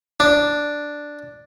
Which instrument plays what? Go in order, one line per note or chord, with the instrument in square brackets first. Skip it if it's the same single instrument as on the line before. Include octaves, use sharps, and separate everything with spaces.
[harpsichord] D4